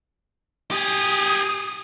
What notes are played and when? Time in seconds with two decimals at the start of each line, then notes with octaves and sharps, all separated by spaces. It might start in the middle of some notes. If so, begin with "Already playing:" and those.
0.71 G4 G#4 D#6